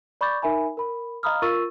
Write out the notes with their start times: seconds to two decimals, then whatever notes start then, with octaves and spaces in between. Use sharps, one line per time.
0.21 D5 B5 C#6 D6 G6 A6
0.42 D#4 A#4 E5 G#5 B5
0.77 A#4 B5
1.23 D#5 F5 A#5 B5 D#6 F6
1.42 F4 A#4 C#6 E6 A6 D#7